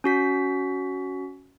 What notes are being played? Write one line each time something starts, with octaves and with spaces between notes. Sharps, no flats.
C#4 F#4 B6